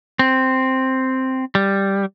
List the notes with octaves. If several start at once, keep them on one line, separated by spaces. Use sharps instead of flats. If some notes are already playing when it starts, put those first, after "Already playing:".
C4
G3